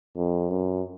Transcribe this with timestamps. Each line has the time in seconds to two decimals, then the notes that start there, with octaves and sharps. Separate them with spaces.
0.17 F2
0.50 F#2